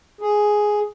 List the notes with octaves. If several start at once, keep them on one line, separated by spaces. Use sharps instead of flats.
G#4